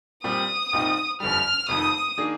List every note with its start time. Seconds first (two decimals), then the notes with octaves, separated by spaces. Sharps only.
0.24 A#2 G3 C4 G4 D5 D#6
0.73 C2 A#2 G3 C4 D#4
1.20 G1 F2 D3 G3 F6
1.69 F1 F2 D#3 D#6
2.17 D#3 A#3 D4 G#4